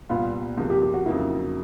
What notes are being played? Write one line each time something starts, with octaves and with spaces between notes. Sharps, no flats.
C2 A#2 G3 B3 F4
C#2 C3 F3 A#3
G4
G4
F#4
F2 C#3 F#3 A#3 D#4 E4